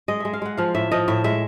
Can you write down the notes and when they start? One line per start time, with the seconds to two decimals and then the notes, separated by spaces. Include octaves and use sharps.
0.08 G#3 D#5
0.20 G#3 E5
0.33 F5
0.42 G#3 F#5
0.57 F3 F5
0.74 A2 E5
0.91 F3 D#5
1.08 A2 E5
1.24 G#3 E5